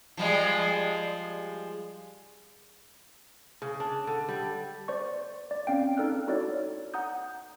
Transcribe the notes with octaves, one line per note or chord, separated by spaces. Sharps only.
F3 G3 G#3
C#3
D4
D3
G3
C5 D5 C#6
D5
C4 C#4 F5 G5
C4 D#4 A4 D5 F6 F#6
D#4 E4 F#4 A4 C#5 D5
F#5 A#5 D#6 G6